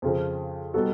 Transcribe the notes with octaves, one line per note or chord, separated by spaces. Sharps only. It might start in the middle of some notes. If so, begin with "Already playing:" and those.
F2 C#3 F3
G3 B3 D#4 F#4 A4